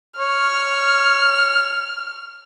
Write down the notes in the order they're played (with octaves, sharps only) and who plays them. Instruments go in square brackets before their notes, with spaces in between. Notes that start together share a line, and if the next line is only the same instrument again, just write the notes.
[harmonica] C#5 [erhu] F6